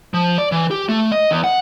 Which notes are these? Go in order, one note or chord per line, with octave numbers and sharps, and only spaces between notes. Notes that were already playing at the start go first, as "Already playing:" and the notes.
F3
D5
E3
G4
A3
D#5
E2
F#5